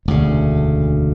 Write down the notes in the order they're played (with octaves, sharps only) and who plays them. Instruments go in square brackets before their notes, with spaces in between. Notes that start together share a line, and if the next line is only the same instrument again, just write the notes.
[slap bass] E1 D2 C#3